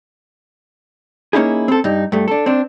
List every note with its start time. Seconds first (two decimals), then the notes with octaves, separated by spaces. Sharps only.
1.33 A#3 C#4 D#4 E4 G#4
1.68 C4 A4
1.84 G2 D#4
2.12 G2 A3
2.28 D4 A4
2.46 C4 D4